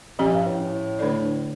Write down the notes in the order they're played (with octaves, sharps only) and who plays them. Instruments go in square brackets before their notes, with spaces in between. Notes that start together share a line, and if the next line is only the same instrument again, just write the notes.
[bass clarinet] A#2 [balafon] F3 C#4 G4
[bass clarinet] G2
A2
A2
[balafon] D3 A3 D4 A4 D5